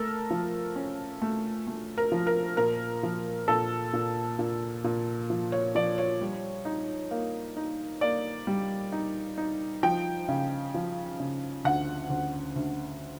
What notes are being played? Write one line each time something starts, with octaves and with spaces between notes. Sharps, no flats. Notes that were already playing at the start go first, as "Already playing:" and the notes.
Already playing: A3 A4 A#4
F3
C#4
A3
A3
A#4
F3
A#4
A#2 A#4
F3
A#2 A4
A#2
A#2
A#2
F3
C#5
F3 D5
C#5
G3
D#4
A#3
D#4
A#3 D5
G3
D#4
D#4
F3 G5
C#3
F3
C#3
D2 F#5
D2
D2